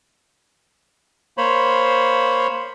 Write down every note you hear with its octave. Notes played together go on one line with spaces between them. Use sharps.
A#3 C5 C#5 B5